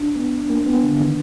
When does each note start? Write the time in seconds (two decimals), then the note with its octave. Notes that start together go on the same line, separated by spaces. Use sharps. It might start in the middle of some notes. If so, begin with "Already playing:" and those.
Already playing: D4
0.16 B3
0.49 A#3
0.66 B3
0.83 D3
1.00 D#3